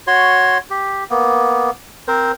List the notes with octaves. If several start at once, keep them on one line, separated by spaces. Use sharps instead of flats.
F#4 C#5 C6
G4
A#3 B3
C4 A#4 C5